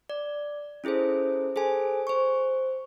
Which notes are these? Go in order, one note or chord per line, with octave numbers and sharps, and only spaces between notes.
D5
C#4 E4 G#4 A4 C5
G#4 A4 C5 G#5
C5 C#6